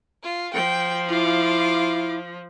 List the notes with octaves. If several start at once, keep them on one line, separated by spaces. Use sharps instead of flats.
F4
F3 G5
E4 F4 D6